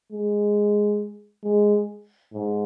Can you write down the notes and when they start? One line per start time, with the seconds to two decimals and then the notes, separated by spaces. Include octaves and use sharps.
0.12 G#3
1.44 G#3
2.34 G#2